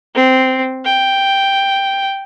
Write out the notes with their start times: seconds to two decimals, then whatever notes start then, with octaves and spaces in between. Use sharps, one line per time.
0.15 C4
0.85 G5